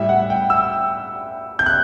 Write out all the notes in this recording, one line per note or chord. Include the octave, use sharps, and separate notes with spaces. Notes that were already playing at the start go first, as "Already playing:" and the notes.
Already playing: A2 G3 E5
F#5
G5
E6
G6
F#6